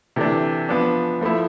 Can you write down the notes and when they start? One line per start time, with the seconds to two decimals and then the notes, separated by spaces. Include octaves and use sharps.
0.16 C3 E3 A3 D4
0.69 F3 B3 D4
1.21 F3 A3 E4